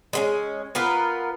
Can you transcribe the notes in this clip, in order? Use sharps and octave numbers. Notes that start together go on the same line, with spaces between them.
G#3 B3 C#4
B3 F4 A#4 B4